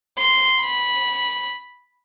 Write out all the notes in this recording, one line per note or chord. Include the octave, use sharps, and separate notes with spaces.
C6
B5